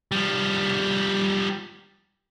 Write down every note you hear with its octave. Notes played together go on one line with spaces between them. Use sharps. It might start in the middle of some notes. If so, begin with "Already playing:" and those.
F3 G3